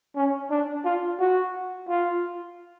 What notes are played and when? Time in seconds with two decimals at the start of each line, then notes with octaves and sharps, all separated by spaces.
0.16 C#4
0.50 D4
0.85 F4
1.20 F#4
1.89 F4